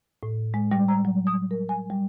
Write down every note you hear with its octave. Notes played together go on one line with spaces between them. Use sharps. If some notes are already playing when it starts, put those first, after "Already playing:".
A2
G#3
G3
A#5
F#3
D#6
A#4
G#5
G3